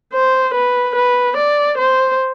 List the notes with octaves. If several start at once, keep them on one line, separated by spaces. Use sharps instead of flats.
C5
B4
B4
D5
C5